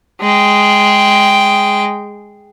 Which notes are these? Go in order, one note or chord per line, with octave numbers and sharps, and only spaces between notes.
G#3 G5